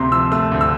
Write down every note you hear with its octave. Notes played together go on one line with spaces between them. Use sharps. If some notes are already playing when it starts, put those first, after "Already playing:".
Already playing: D2 C3 A#5 C6
F3 E6
A3 E6
D2
E6